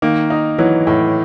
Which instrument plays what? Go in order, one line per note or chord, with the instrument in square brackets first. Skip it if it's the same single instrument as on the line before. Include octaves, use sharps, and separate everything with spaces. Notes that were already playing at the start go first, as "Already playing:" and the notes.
[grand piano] D#3 [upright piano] A#3
[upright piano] D#4
[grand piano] E3 [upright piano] F#3
[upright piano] A2